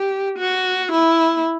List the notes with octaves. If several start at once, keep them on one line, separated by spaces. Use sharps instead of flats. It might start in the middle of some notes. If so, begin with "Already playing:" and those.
Already playing: G4
F#4
E4